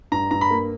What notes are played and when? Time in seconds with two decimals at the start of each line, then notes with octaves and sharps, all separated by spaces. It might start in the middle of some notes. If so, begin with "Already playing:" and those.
0.12 G2 A#5
0.31 G2 A#5
0.41 B5
0.51 A#3